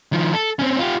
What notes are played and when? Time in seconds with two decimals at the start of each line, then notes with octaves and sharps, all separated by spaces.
0.13 D#3 F3
0.33 A4
0.59 C4 C#4
0.79 F4 G4